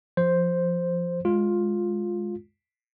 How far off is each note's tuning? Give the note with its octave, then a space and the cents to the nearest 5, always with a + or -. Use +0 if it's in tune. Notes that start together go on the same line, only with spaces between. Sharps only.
F3 -5 C5 +0
G#3 +0 F4 +10